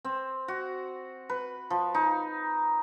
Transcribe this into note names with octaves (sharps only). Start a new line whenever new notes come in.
C4
F#4
B4
F3
D#4